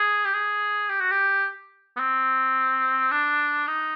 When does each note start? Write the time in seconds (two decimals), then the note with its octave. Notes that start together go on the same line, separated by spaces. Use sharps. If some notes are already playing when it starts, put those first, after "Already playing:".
Already playing: G#4
0.25 G4
0.34 G#4
0.89 G4
1.00 F#4
1.11 G4
1.96 B3
2.00 C4
3.11 D4
3.67 D#4